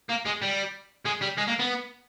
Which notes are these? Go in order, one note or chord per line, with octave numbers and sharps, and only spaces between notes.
A#3
G#3
G3
G#3
G3
G#3
A#3
B3